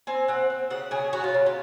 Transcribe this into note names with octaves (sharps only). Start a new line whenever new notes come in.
C4 G#5
C4 F#5
C4
C#3 F#5
C#3 G#4
F#3 F#4
F4
C#3
F4